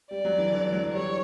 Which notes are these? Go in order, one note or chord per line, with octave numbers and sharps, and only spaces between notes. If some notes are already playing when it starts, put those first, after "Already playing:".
G3 D5
F#3
E3
D3
F#3
G3 C#5